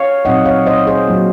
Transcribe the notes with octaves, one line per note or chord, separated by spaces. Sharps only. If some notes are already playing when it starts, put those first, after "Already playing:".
Already playing: C#5 F5
A#2 F#3 C4 D#4 D#5 F#5
C#5 F5
C5 D#5
G#4 C5
A#2 F#3 A#3 F4